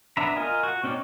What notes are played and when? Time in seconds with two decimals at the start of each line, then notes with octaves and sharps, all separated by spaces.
0.17 B3 D4 E5 A#5 B5
0.36 F4 A#4 D#5 G#5
0.63 F#4
0.84 C4 C#4 D#4 C#5 D5